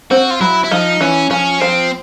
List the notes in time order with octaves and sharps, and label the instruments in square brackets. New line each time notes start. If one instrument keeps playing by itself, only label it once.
[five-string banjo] C4 [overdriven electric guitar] F#4
[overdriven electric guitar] F4
[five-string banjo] F#3 [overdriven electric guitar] E4
[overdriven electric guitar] E4
[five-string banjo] F3 [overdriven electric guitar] D#4
[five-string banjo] E3 [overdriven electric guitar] C#4
[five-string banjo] F3 [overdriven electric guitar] C#4
[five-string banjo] F3 [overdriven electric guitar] C4